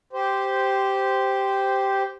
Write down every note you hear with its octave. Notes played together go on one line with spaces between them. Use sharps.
G4 C5